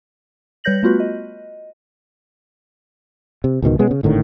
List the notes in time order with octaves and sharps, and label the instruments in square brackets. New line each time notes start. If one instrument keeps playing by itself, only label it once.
[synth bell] G3 B4 C#5 G6 A#6 F#7
A3 B3 F4 F#4 B4
D#5
[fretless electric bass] C3
C#2 G#2 B2 D#3
B2 G#3 B3 C#4
C#3
G#1 A2 D3 D#3